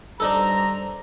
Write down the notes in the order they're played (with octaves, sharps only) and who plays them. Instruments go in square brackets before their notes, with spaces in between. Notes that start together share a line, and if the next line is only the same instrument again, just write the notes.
[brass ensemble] G2 C5 A#5 [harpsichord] D4 D#4 A4